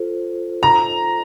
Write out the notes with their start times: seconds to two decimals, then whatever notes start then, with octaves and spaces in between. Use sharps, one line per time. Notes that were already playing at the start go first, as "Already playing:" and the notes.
Already playing: F4 A4 C5
0.63 A#5